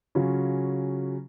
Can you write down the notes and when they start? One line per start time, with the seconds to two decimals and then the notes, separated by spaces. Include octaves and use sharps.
0.15 C#3 F#3 C#4 F4